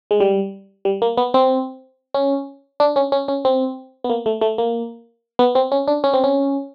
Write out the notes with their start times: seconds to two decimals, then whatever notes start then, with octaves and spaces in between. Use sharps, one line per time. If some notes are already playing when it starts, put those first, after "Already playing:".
0.11 G#3
0.20 G3
0.85 G3
1.02 A#3
1.17 B3
1.34 C4
2.14 C#4
2.80 D4
2.96 C#4
3.12 C#4
3.28 C#4
3.45 C4
4.04 B3
4.10 A#3
4.26 A3
4.41 A3
4.58 A#3
5.39 B3
5.55 C4
5.72 C#4
5.88 D4
6.04 C#4
6.14 C4
6.24 C#4